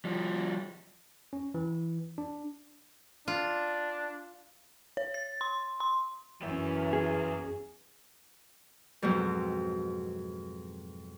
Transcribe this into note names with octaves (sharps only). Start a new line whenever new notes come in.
F3 G3
C#4
E3
D4
D4 F4
C#5
A6
C6
C6
F#2 E3 B3 C#4 E5
G#4
F2 G#2 B2 F#3 C4